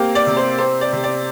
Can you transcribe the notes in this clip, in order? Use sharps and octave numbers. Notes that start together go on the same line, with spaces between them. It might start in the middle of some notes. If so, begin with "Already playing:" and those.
Already playing: A#3 C4 G4
D5
C3
C5
C4 C5
D5
C3
D5